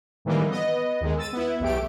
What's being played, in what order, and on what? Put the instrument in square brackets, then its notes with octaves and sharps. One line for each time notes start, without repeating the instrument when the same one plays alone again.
[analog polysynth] A2 D#3 E3 G3 G#3 A#3
B3 D#5
D#2 D#3 G#3
E6 A6 D#7
B3 E4
B1 E2 A3 G4 D7